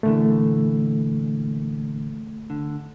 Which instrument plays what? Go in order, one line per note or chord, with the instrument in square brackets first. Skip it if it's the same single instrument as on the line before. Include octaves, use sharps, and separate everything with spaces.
[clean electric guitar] A#2 D3 E3 [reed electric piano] A3
[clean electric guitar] D3